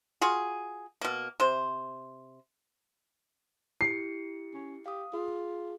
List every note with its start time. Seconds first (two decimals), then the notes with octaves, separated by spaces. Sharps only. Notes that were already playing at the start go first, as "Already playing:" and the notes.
0.21 F4 F#4 G#4
1.01 B2 A#3
1.40 C3 C5
3.81 E4 G4 C7 C#7
4.54 C#4
4.86 G4 F5 D#6
5.13 F4 G#4